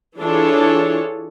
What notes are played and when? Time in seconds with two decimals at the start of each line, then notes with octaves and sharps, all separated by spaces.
0.18 E3 D4 F4 G#4 A4 C#5